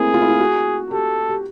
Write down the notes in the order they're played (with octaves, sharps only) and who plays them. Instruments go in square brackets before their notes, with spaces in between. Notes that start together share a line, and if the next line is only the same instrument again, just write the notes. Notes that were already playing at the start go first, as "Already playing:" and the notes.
Already playing: [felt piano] A3 A#3 C4 E4 [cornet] G#4
[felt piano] F4
E4
F4
F#4
[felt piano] G4 [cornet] A4
[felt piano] G4